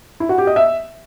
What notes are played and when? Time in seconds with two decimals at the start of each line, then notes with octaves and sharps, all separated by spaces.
0.20 E4
0.29 F#4
0.38 G4
0.47 D#5
0.56 E5